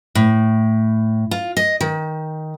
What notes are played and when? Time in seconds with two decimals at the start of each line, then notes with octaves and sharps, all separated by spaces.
0.15 A2
1.31 F4
1.57 D#5
1.81 D#3